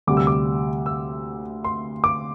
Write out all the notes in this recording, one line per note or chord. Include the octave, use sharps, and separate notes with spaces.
D2 C3 G3 D6
E6
D6
E6
C6
D6